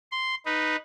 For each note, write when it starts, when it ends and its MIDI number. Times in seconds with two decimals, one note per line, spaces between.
0.12 0.35 84
0.46 0.76 63
0.46 0.76 71